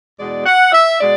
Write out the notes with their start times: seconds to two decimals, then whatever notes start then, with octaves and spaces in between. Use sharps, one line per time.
0.19 E2 B2 G#3 D5
0.46 F#5
0.73 E5
1.00 B2 G#3 D5